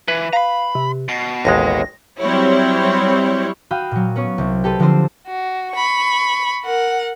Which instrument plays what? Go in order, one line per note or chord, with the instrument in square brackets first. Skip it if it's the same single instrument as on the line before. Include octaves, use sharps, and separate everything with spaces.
[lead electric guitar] E3 [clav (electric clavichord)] B4
[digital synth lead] F5 [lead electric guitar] A#5 B5
[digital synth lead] C3
[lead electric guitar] B2 [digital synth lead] C7
[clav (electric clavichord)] A1 D#2 G#3 [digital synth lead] A#6
[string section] F#3 G3 C4 E4 C#5
[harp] F#4 F5 G5 B5 D#6
A#2 F#3
B3 C#4 C#5
C2 C3
G4 A4 B4 C5
D3 F3 C4 D4 F4 C5
[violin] F#4
B5 C#6
A#4 F#5